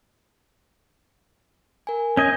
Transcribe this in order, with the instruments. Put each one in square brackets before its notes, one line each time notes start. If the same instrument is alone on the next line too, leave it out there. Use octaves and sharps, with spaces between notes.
[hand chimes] A#4 G#5
[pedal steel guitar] C#4 D#5 G#5 [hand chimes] G6